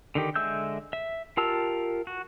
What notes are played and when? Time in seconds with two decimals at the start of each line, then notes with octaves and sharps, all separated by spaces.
0.15 D3 D#3 G4
0.35 D3 G#3 E5 E6 G6
0.93 E5
1.37 F4 G4 A#4 A5 E6
2.07 F#4